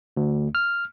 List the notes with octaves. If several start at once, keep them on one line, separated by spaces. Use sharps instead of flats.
D2
F6